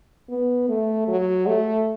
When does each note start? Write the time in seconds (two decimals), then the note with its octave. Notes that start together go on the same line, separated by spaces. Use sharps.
0.29 B3
0.69 A3
1.08 F#3
1.47 A3